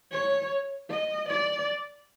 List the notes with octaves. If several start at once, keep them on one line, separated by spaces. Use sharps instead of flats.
C#5
D#5
D5